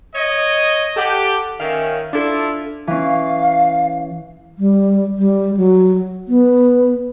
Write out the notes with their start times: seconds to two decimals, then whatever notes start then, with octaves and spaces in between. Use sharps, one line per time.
0.14 C#5 D#5
0.96 G4 A4 F#5 A5
1.60 D#3 C#4 E5 F5
2.13 D4 E4 F4 A4
2.87 E3 C#4 F5
4.59 G3
5.18 G3
5.57 F#3
6.28 B3